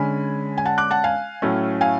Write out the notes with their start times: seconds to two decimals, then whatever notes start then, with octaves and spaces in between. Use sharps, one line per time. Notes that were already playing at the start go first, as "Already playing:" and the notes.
Already playing: D3 G#3 C#4 G#5 B5
0.58 G#5
0.66 F#5 A5
0.78 D6 F#6
0.91 F#5 A5
1.04 F5 G#5
1.42 A2 F#3 A3 C#4
1.81 F5 G#5